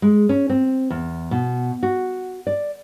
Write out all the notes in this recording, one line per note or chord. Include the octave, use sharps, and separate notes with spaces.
G#3
C#4
C4
E2
B2
F#4
D5